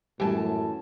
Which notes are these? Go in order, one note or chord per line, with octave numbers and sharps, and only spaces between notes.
F#2 A2 E3 G3 G#3 G4 G#5 A5